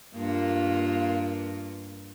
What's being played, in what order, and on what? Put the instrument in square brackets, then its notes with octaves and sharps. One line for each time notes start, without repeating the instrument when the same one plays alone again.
[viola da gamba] G2 A#3 F4